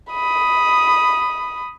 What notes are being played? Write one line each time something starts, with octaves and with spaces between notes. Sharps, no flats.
B5 D#6